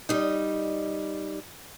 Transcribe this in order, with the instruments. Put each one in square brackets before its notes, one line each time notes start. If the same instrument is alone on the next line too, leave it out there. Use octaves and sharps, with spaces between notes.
[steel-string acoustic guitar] G3 D#4